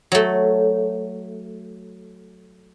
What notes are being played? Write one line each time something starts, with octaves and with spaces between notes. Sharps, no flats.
F#3 A3